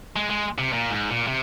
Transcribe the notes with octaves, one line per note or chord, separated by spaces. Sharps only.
G#3
G#3
C3
A#2
G#2
A#2
C3